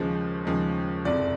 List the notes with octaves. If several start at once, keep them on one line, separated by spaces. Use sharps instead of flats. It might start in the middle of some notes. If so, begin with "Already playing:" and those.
Already playing: D#2 C#3 F3 G#3 C5
D#2 C#3 F3 G#3
F#1 F2 C3 D5